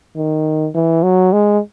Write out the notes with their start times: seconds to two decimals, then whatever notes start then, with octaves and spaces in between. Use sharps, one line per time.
0.16 D#3
0.74 E3
1.03 F#3
1.33 G#3